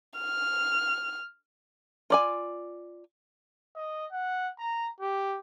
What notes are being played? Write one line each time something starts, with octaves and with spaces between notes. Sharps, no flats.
F6
F4 D5 G#5
D#5
F#5
A#5
G4